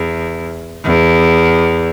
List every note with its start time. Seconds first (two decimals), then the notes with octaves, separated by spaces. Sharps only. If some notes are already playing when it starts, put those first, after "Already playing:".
Already playing: E2
0.85 E2